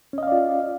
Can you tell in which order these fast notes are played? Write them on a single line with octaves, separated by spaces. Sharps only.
C#4 D#5 F5 D5 F4